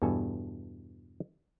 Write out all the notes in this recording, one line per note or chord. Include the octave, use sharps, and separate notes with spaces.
E2 G2 B2 A4 G#5